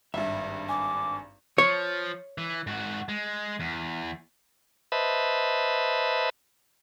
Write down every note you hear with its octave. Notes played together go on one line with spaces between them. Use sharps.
G#1 G2 E5
G#5 D6
F3 C#5
E3
G#2 F#4
G#3
E2
B4 C5 D#5 E5 A5 B5